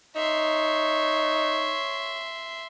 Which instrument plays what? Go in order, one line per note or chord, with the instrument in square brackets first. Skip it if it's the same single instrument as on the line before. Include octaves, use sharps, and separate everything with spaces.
[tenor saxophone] D#4 [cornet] C#5 [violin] E5 C6